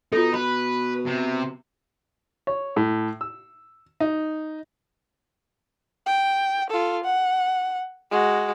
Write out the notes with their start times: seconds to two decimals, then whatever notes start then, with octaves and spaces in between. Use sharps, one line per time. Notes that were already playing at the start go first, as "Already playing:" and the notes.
0.13 B2 D#4 F4 A4
0.34 B4 B5
1.06 C3
2.47 C#5
2.76 A2
3.21 E6
4.00 D#4
6.06 G5
6.70 F4 A4
7.04 F#5
8.11 G#3 F#4